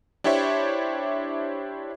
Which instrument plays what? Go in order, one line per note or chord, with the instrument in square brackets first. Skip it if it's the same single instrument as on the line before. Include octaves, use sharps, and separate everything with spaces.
[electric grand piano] D4 E4 G4 C5 C#5 E5